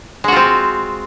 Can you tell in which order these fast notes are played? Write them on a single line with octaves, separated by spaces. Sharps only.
G#3 F#4 F4 C4